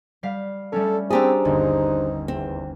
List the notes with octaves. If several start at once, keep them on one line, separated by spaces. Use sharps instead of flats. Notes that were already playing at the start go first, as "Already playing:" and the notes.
G3 F5 B6
G3 A3 C#4 A4
C4 D4 G4 G#4 C5 A5 A#5 E6
G1 D#2 D#4
E2 C4